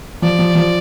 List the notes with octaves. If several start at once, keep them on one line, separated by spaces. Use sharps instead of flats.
F3 D5
F3
F3